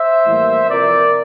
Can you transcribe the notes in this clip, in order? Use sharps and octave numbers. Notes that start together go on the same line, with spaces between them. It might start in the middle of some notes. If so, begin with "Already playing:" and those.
Already playing: C5 E5
A2 E3 G3 A#3
F2 C3 E3 A#4 D5